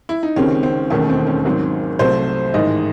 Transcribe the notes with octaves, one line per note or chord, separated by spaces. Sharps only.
E4
D#4
C#2 C3 D#3 G#3 C4 C#4
C4
E1 D#2 D#3 A3 C#4
C4
C#4
G#1 G#2 F#3 C4
C2 C3 F#3 A3 C5
A1 G#2 D#3 D#5